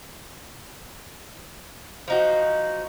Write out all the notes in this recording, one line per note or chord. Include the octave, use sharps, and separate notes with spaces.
F3 D#4 F#4